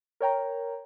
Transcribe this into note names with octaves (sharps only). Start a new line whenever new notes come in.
A#4 C#5 G5 A#5